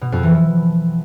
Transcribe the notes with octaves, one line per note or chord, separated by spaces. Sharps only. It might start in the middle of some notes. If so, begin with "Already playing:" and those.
B2
F2
E3
F3